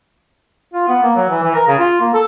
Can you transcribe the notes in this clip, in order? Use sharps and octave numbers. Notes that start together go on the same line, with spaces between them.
F4
B3
A#3
F#3
E3
E3
A#4
C#3
F4
A#3
A4